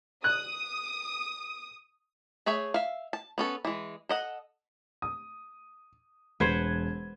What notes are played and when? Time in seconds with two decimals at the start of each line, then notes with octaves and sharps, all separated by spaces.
0.24 D#6 F#6
2.46 A3 G#4 C#5 E5
2.74 E5 F5
3.13 A5
3.38 B3 C#4 A4
3.65 E3 G#3
4.09 A4 D#5 F#5
5.02 D#6
6.40 E1 B4 C5 F#5 G#6